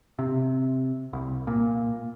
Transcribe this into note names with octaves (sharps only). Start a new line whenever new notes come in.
C3
C2
A#2